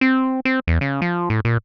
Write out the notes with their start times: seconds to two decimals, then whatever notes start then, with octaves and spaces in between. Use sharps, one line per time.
0.01 C4
0.45 C4
0.67 E2
0.81 C#3
1.02 F3
1.30 A2
1.45 A#2